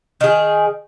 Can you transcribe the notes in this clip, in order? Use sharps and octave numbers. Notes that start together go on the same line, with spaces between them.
D#3 G#4